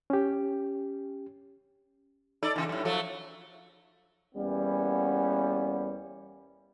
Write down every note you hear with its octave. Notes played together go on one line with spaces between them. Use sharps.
C#4 G4
D#4 A4 D5
E2 C#3
F#2 A2
F3 F#3 A3
E2 G3 A#3 B3 C#4